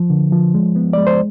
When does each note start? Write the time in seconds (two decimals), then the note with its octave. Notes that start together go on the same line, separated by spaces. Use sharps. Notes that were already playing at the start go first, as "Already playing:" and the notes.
Already playing: F3
0.10 D3
0.32 F3
0.54 G#3
0.76 B3
0.93 G#3 D5
1.07 C5